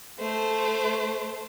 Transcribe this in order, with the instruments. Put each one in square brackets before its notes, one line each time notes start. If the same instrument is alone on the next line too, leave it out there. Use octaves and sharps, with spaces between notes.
[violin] A3 C5